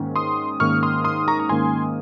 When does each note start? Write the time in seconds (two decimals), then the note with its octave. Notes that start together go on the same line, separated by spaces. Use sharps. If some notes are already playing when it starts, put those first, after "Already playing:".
Already playing: G#2 D#3 A#3 C#4
0.16 C6 D#6
0.60 G#2 D#3 A#3 C#4 C#6 F6
0.83 C6 D#6
1.04 C6 D#6
1.28 A#5 C#6
1.40 A#5
1.49 G#2 D#3 A#3 C#4 G#5 C6